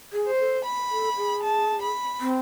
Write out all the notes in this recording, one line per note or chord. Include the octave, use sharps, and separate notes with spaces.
G#4
C5
A4
B5
A4
G#4
A5
B5
C4